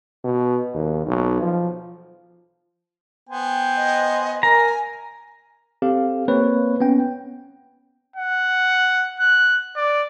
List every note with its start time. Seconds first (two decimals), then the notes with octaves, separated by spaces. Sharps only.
0.24 B2
0.74 D#2
1.06 B1
1.41 F3
3.29 B3 C5 G5 G#5
3.76 D#5
4.43 A#4 G#5 A#5
5.82 C4 G4 A4 F5
6.28 A#3 C4 B4 C#5
6.80 B3 C#4 G5
8.16 F#5
9.20 F#6
9.76 D5